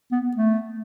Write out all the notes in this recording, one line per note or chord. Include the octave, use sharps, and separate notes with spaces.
B3
A3